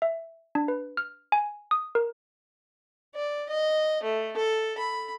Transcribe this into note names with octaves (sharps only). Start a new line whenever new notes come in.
E5
D4
B4
F6
G#5
D#6
A#4
D5
D#5
A3
A4
B5